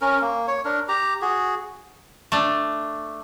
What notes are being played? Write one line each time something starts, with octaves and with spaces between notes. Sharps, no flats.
C#4 A#4
A#3
C#5
D4 A#4
G4 A#5
F#4 G#4
A3 D4